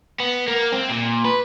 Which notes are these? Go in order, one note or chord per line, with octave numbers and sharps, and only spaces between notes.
B3
A#3
C4
A#2
B4